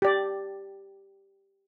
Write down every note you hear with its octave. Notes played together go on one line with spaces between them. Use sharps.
G4 D5